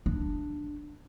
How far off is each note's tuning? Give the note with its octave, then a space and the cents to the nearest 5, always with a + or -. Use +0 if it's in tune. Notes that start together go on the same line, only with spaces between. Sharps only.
D4 +5